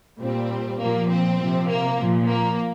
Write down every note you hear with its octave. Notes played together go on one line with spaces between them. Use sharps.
A#2 G3 C4
A#2 F3 A#3
C4
C3 F3
A#3
A#2 F3
A#3